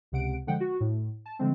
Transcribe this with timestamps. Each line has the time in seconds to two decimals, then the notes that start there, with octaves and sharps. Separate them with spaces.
0.12 C#2 C3 F#5 D7
0.47 D3 F3 G#3 F#5 G5
0.60 F#4
0.80 A2
1.26 A5
1.39 D3 F3 G#3 A3 C4